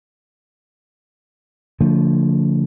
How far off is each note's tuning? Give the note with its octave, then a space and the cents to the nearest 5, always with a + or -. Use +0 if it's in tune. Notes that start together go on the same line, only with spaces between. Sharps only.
D3 -35 F3 +0 A3 +35